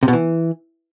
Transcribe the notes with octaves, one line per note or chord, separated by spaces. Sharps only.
C3
B2
E3